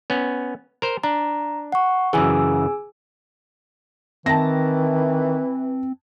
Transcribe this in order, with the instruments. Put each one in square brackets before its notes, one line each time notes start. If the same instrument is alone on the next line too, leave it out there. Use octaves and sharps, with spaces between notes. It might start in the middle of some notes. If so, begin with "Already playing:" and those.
[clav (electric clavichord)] B3 C#4
A#4 C5
[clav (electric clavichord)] D4 [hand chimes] A#5
[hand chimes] F#5 C#6
[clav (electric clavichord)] F#2 C#3 E3 [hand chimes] G#4 G#5 E6
[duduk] D#3 [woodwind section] E3 [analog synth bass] C4 [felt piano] A5 A#6